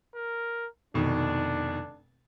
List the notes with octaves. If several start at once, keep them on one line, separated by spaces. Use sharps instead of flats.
A#4
F1 B2 D#3 D4